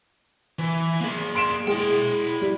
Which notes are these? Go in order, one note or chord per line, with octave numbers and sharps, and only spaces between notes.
E3
A#3 G#4
C6 D7 E7
G#3 E4 G5
G3